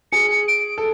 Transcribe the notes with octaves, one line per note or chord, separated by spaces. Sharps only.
G#4 C#7
D7
A4